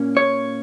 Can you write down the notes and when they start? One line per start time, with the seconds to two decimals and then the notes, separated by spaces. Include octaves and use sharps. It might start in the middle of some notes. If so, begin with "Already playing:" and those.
Already playing: A#2 A#3 C#4
0.17 C#5